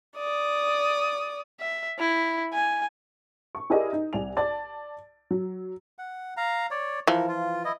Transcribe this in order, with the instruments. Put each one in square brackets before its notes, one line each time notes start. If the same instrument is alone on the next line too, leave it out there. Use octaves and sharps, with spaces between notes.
[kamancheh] D5 D#6
[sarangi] E5
E4
G#5
[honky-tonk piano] C#6
E4 G4 G#4 A#4 D5 D#5
D#4
C2 D5 G#5 F7
D5 A5 A6
F#3
[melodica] F#5
F5 A#5
C#5 D5
[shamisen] E3 F3 [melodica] A#4
[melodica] F4
E4 D#5